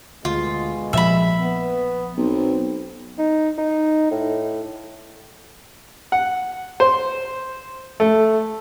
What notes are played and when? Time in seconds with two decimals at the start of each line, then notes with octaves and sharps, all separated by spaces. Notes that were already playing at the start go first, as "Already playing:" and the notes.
0.25 D2 B2 D3 G#3 F4
0.93 A#1 F3 E5 B5
1.40 B3
2.17 B1 C4
3.19 D#4
3.58 D#4
4.11 A2
6.12 F#5
6.80 C5
8.00 A3